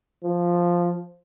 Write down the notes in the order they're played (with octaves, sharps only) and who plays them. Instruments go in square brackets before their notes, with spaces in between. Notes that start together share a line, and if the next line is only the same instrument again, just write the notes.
[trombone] F3